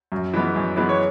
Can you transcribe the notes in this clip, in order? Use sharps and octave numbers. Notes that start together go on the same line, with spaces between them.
F#2
E3 G#3 B3
F#2
E3 G#3 B3
C#5